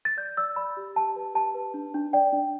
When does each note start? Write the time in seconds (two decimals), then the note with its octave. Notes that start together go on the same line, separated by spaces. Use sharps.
0.05 A6
0.17 D5 G6
0.37 D5 E6
0.56 D5 B5
0.77 G4
0.96 G4 A5
1.16 B4
1.34 G4 A5
1.55 B4
1.74 D4
1.94 D4
2.13 D5 G5
2.33 D4